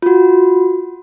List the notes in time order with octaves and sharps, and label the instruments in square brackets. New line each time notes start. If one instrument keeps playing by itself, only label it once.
[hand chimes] F4 F#4